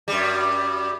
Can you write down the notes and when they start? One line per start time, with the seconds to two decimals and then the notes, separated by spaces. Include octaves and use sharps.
0.08 F#2 G3